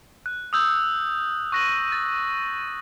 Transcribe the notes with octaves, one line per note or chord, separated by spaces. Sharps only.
F#6
D#6 E6 G6
C#6 F#6 A#6 D#7 F#7
A6